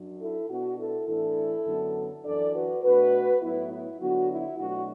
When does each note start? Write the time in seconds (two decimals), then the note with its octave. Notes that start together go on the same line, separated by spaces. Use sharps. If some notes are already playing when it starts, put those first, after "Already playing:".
Already playing: F#2 F#3 D4
0.20 E4 A4
0.49 B2 B3 D4 F#4
0.77 E4 A4
1.07 A2 E3 D4 E4 A4
1.66 F#2 D3 F#3 B3 D4
2.24 F#2 E3 D4 A4 D5
2.53 F#4 B4
2.82 B2 A3 D4 F#4 B4
3.41 A2 F#3 B3 E4
3.71 E4
4.00 D3 F#3 B3 D4 F#4
4.29 E4
4.58 B2 F#3 A3 D4 F#4